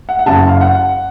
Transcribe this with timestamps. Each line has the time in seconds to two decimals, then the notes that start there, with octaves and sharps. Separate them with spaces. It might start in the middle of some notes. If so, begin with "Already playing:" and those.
0.09 F#5
0.19 F#5
0.26 F#1 F#2 C#3 A5
0.49 F5
0.61 F#5